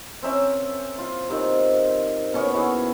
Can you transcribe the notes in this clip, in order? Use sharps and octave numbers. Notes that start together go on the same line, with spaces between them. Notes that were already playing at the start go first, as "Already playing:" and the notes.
C4 C#4 A#4 E5
F4
C3 D#3
B2 C#4 C#6
E4 F#4 G#4